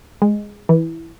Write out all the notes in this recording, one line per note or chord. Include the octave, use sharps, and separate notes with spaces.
G#3
E3